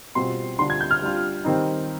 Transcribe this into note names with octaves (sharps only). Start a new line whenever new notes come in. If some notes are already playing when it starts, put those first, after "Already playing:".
B2 G3 C4 F4 C6
D3 G3 D4 F4 C6
G#6
G6
F6
G3 D4 F4
D#3 G3 C4 D#4